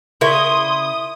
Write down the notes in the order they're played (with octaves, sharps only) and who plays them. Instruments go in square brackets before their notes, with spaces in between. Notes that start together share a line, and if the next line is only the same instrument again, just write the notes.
[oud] C#3 A#4 C#5 [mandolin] E4 [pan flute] C6 [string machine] D#6